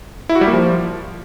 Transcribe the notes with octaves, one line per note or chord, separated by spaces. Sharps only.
E4
F#4
G3
A#3
F3